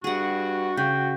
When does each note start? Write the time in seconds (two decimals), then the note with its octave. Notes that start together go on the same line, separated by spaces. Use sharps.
0.04 G2 F#4 G#4 F#5
0.77 C#3 F#4 G5